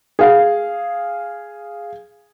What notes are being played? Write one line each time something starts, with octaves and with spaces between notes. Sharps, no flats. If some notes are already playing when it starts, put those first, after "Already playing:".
G#4 F5